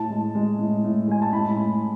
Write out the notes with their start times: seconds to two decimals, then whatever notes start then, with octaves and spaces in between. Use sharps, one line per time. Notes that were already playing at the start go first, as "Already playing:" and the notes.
Already playing: A2 A5
0.10 G#3
0.35 G#3
0.59 A2
0.84 A2
1.08 G#3 G#5
1.22 A5
1.33 A2 B5
1.57 A2